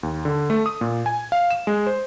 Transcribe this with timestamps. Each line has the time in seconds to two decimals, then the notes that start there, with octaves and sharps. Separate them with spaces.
0.03 D#2
0.25 D3
0.50 A3
0.66 D#6
0.81 A#2
1.06 G#5
1.32 F5
1.50 E7
1.67 G#3
1.87 C5